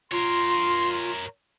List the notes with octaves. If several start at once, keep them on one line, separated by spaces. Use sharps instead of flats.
F4 A#4 C#5 C6